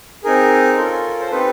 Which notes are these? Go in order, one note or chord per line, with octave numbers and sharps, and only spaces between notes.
C4 D#4 G#4 A#4
C#4 F4 A4
C5
C4 D#4 G4 A4 B4